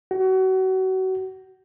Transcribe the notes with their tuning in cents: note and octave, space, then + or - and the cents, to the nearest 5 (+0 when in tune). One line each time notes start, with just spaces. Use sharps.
F#4 +30